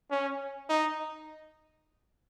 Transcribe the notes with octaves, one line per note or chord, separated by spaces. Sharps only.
C#4
D#4